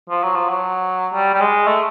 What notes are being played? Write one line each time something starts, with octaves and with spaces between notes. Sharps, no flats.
F3
F#3
F3
F#3
G3
G3
G#3
A3